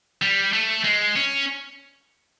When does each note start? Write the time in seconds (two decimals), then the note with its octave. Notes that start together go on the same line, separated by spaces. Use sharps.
0.22 G3
0.53 A3
0.84 G#3
1.16 C#4